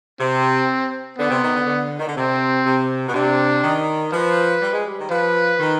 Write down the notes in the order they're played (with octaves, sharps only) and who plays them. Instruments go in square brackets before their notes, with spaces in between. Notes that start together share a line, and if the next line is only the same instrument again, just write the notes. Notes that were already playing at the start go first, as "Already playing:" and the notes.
[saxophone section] C3 [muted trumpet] C4
[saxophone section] D3 [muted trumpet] B3
[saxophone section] C3
D#3
D3
D3
D#3
D3
[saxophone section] C3 [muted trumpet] C4
[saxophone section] C3
B2
[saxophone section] C3 [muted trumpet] D4
[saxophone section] D#3
[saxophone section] F3 [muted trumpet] B4
[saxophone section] G3
G#3
G3
D#3
[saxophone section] F3 [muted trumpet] B4
[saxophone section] D#3